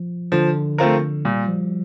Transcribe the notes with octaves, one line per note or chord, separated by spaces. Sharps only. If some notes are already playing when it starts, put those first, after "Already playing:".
Already playing: F3
D3 F3
A3 C4 F4 A#4
A#2 G3
F3